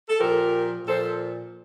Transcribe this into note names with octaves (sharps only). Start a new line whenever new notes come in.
A4
A#2 F3 G4 A#4
A#2 F3 A4 C5